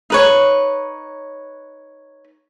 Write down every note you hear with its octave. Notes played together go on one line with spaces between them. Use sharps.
D#4 B4 C#5